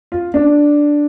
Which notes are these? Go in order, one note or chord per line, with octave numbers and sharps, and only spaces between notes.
F4
D4